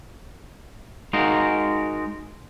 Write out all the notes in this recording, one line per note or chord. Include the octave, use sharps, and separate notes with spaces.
G#3 D#4 F#4 A#4 F5